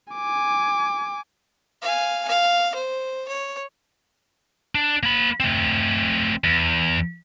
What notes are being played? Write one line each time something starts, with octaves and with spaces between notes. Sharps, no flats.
G#5 D6
F5 G#5
F5
C5
C#5
D4
A#3 B5
A3 C4
E2